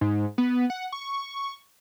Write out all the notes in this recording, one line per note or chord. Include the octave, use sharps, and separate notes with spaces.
G#2
B3
F#5
C#6